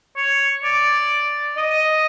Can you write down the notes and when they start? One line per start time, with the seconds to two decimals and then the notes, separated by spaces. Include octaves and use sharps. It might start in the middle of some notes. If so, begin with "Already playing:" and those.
0.16 C#5
0.64 D5
1.56 D#5